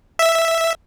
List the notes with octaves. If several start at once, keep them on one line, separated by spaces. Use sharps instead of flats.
E5